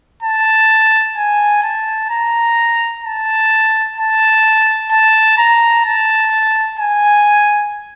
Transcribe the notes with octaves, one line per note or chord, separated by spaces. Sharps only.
A5
G#5
A5
A#5
A5
A5
A5
A#5
A5
G#5